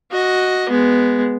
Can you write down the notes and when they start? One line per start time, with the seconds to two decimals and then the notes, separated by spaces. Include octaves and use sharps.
0.11 F#4 D#5
0.69 G#3 B3